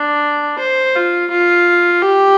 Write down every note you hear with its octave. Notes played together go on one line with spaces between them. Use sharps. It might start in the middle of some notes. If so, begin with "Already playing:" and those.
Already playing: D4
C5
F4
F4
G4